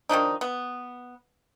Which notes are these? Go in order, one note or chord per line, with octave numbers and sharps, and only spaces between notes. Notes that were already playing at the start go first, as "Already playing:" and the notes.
D#3 F3 D4 D#4
B3